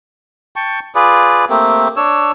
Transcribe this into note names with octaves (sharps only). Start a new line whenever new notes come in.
G5 A5 C#6
F4 G#4 B4 D5
A3 A#3 C4 G4
D4 C#5 E6